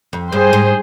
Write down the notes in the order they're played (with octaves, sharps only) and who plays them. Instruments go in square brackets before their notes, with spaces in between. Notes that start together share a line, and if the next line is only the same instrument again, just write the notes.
[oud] F2
[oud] G2 [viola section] G#4 C5
[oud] G#2